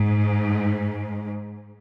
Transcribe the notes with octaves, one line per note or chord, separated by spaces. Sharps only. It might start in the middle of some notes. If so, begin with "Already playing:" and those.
Already playing: G#2